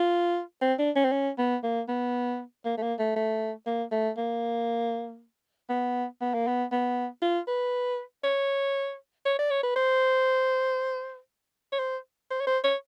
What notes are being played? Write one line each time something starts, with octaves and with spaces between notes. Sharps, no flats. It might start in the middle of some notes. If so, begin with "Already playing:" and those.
Already playing: F4
C4
D4
C#4
C4
C#4
B3
A#3
B3
A#3
A3
A#3
A3
A3
A#3
A3
A#3
B3
B3
A#3
B3
B3
F4
B4
C#5
C#5
D5
C#5
B4
C5
C#5
C5
C5
C#5
C5
C#5